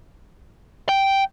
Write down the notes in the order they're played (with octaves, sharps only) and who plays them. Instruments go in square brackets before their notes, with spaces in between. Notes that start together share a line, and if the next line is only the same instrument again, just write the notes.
[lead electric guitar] G5